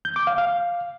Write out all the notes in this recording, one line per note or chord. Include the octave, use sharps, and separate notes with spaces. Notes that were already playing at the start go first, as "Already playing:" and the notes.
G6
D6
F5
F5